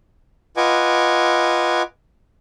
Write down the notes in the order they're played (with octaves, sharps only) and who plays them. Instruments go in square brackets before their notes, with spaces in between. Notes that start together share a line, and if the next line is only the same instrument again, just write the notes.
[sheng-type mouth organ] F4 B4 D#5 F#5 G#5 D6